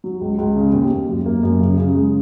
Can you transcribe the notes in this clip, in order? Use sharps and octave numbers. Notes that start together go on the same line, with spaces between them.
F#3
C#2
C#2
C#3
D#2
D#2
F#2
A#3
F#2
C#3
C#3
G#3